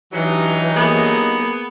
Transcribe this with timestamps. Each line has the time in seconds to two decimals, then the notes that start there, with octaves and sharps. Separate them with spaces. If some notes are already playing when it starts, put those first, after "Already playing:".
0.13 G2 E3 F#3 D#4
0.77 A#3 B3 G#4